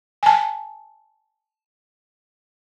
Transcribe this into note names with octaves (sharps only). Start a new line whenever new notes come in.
G#5 A5